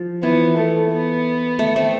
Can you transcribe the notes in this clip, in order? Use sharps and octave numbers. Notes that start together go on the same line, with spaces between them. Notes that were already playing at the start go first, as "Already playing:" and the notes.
Already playing: F3
E3 B3
A3
B3
A3
A3 C4